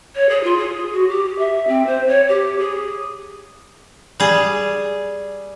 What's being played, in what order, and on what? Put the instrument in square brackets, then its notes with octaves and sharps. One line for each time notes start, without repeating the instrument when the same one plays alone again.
[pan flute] C#5
G#4
F4
G#4
F#4
G4
E5
C4
C5
C#5
G4
G#4
[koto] G3 G#4